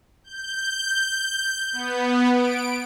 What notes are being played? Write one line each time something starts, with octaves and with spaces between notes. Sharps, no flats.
G6
B3
D7